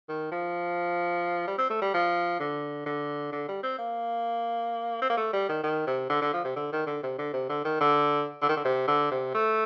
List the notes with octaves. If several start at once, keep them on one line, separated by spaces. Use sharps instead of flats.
D#3
F3
G3
C4
A3
G3
F3
D3
D3
D3
G3
C4
A#3
C4
A#3
A3
G3
D#3
D#3
C3
D3
D3
F3
C3
D3
D#3
D3
C3
D3
C3
D3
D#3
D3
D3
D#3
D3
C3
D3
C3
A3